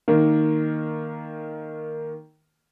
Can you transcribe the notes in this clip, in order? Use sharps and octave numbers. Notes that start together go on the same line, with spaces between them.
D#3 A#3